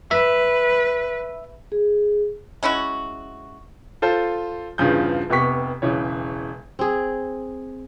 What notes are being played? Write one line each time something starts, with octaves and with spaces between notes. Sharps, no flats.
B4 E5
G#4
G#3 C#4 E4 F#4
F4 A4 C5
E2 G2 C#3 F3 G6
F1 C3 B3 G4 C#6 B6
E1 C#3 E3 C#5
C4 G#4